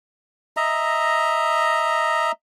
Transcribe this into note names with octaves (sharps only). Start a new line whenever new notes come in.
D#5 E5 A#5